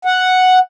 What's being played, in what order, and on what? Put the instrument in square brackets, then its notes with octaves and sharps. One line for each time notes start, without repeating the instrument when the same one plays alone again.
[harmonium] F#5